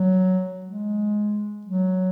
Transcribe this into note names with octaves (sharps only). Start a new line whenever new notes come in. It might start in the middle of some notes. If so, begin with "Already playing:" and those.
Already playing: F#3
G#3
F#3